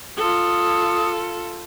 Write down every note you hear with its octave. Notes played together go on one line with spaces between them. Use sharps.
F4 A4 D#6